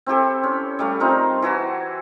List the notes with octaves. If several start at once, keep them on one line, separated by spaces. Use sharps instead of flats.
C4 E4 G4 A4
C#4
G3 A3 F5
C4 D#4 F4 A#4
E3 E4 F#4 A5